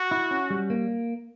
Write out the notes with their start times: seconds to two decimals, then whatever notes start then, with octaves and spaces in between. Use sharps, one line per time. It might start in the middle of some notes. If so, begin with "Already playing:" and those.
Already playing: F#4
0.11 E4
0.31 C#4
0.50 G3
0.70 A#3